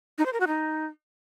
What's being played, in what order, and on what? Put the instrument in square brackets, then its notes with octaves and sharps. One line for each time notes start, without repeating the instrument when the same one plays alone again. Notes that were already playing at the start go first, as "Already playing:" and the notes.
[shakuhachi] D#4
C5
A#4
F#4
D#4